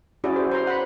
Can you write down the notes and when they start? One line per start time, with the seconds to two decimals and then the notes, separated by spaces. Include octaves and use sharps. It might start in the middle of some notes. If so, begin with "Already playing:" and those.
0.24 C#4 E4 F#4 G#4 D5
0.36 C5
0.51 C5 A#5 C6
0.67 F#5 B5